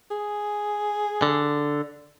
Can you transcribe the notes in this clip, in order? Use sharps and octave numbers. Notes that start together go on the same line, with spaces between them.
G#4
D3